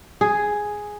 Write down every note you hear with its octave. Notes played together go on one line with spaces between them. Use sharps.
G#4